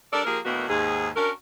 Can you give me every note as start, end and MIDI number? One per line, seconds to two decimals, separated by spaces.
0.13 0.22 55
0.13 0.22 62
0.13 0.22 69
0.13 0.22 70
0.13 0.22 74
0.25 0.39 53
0.25 0.39 58
0.25 0.39 67
0.25 0.39 68
0.25 0.39 70
0.45 0.65 38
0.45 0.65 45
0.45 0.65 51
0.45 0.65 58
0.45 0.65 59
0.45 0.65 66
0.69 1.09 39
0.69 1.09 44
0.69 1.09 68
1.16 1.31 61
1.16 1.31 62
1.16 1.31 66
1.16 1.31 70